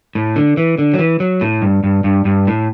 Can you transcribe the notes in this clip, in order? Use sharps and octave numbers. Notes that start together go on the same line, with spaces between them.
A2
D3
E3
D3
F#3
E3
F#3
A2
G2
G2
G2
G2
A2